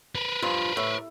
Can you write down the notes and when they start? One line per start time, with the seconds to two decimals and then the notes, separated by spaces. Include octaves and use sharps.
0.15 A#4 B4
0.42 G2 F3 F4
0.77 A2